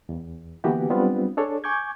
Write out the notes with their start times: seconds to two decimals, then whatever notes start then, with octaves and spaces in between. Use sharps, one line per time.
0.09 E2
0.64 D3 E3 A#3 B3 F#4 G4
0.90 F#3 G3 B3 C4 D4 F4
1.37 D4 G#4 A4 C#5 D5
1.64 G#5 C#6 D6 G6 G#6